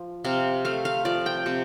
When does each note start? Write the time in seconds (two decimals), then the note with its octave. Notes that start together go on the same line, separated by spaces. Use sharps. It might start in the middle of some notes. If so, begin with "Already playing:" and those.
Already playing: F3
0.25 C3 F5
0.65 A3 F5
0.85 F5
1.05 F3 D5
1.26 G5
1.46 C3